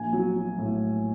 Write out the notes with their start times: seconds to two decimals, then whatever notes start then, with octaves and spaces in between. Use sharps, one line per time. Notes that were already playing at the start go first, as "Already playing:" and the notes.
Already playing: A#1 G#5
0.13 F#3
0.36 F#3
0.58 A2